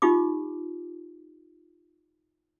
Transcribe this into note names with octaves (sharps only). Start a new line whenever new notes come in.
D#4 F4 G4 D6